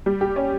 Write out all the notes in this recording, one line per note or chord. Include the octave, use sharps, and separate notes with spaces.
G3
G4
C#4